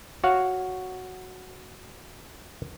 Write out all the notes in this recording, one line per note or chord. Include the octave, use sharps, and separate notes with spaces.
F#4 C#5 F5 F#5